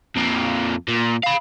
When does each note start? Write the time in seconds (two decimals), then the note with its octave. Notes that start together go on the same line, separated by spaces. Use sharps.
0.16 F2 A#3
0.88 A#2
1.24 F5 B5